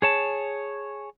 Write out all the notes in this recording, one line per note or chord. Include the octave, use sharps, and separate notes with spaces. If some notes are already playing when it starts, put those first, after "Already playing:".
G#4 C#5 A5